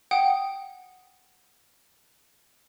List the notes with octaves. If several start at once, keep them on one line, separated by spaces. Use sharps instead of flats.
F#5 G5 D#6 D7